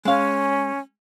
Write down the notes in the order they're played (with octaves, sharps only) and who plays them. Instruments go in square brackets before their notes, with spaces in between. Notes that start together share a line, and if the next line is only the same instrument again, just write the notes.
[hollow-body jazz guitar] G#3 F5 [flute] C#4